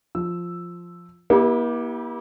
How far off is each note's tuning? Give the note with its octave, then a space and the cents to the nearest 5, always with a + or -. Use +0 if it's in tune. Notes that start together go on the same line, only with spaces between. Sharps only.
F3 +0 E6 +0
A#3 +45 E4 -25 G4 +0